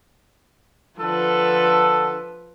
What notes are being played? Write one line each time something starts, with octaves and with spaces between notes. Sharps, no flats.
D3 F3 A4 B4